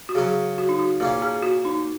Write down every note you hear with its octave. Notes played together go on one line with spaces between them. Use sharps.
F#4
C#3 F#3 C#4 G#4
F#4
D#4
F#4
A#2 A#3 C#4 G#4
G#4
F#4
D#4